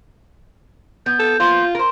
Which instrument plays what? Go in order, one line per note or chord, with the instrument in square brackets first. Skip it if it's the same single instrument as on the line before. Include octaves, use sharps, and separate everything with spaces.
[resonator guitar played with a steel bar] B3 [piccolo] G6
[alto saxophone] A4
[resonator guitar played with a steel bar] A#3 C5 [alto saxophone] F4
[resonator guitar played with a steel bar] A#4 C5